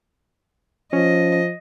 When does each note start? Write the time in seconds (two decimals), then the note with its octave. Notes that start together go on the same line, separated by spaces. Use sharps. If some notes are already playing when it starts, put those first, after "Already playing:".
0.93 F3 C#4 D#5